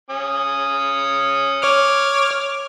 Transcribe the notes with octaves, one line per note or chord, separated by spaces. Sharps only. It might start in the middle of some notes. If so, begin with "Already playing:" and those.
C#4 D#6
C#5 D6 F6